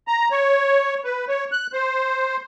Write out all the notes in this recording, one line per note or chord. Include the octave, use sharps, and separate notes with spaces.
A#5
C#5
B4
C#5
F#6
C5